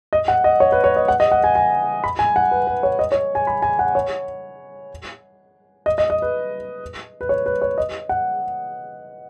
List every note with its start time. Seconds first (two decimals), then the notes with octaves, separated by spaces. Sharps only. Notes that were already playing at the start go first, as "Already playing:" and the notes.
0.13 D#5
0.28 F#5
0.44 D#5
0.60 C#5
0.72 B4
0.84 C#5
0.96 D#5
1.08 F#5
1.20 D#5
1.32 F#5
1.44 G#5
1.55 G#5
2.04 B5
2.19 G#5
2.36 F#5
2.51 B4
2.67 B4
2.83 C#5
2.99 D#5
3.12 C#5
3.35 G#5
3.47 B5
3.62 G#5
3.79 F#5
3.95 C#5
5.86 D#5
5.98 D#5
6.10 D#5
6.22 B4
7.21 B4
7.29 C#5
7.46 B4
7.62 C#5
7.78 D#5
8.09 F#5